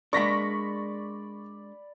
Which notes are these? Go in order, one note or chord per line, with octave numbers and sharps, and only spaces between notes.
G#3 A#3 D4 D5 B5 C#6 A#6 B6